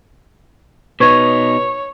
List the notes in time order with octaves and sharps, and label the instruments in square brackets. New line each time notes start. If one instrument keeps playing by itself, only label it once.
[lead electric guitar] B2 D#4 [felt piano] B4 [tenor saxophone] C#5 [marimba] C#6 G#6